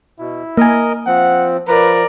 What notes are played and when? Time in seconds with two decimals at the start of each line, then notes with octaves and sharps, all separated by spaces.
0.19 B2 E4
0.58 A#3 A#4 D#5 G#5
1.07 F3 C4 F#5
1.68 F3 A#4 B4 D5